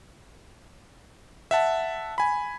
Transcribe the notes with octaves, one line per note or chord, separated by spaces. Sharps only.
E5 F#5 A5
G#5 B5